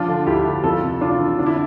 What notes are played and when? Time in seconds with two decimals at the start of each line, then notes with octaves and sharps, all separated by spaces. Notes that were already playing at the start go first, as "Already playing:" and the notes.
Already playing: F3 D4 F4
0.08 D3
0.26 D2 E4 G4
0.45 D2
0.63 F2 F4 A4
0.83 C3
1.01 C3 D4 F4
1.20 E3
1.39 D3 D4
1.46 E4